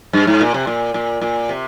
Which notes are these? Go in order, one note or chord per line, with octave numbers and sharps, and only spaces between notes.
G2
G#2
A#2
C3
A#2
A#2
A#2
C3